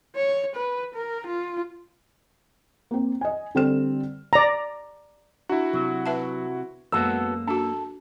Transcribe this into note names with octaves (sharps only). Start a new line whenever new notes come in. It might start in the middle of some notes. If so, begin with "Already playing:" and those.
C#5
B4
A#4
F4
A#3 C4
D#5 G#5
D3 G3 C4 A4 F6 E7
D5 A#5
D4 E4 F#4
C3 F#3
B4 E5 A5
F#2 G#3 A#3 B3 F#4 A4 E6
D4 F#4 A4